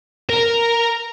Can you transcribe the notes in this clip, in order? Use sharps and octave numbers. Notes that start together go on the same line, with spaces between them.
A#4